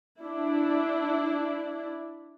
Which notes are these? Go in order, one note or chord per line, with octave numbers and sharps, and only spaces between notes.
D4 E4